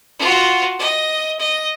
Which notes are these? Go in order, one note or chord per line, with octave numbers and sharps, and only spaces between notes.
F4 F#4
D#5
D#5